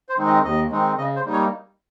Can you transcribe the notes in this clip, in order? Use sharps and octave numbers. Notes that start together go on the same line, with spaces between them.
C5
D#3 G#3 C4 D#4
D#5
D#2 D#5
D#3 G#3 C4 D#4
C#3 D#5
C5
G3 A#3 D#4
C#5